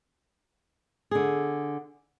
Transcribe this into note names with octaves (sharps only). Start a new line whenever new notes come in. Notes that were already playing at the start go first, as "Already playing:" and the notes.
D3 G#4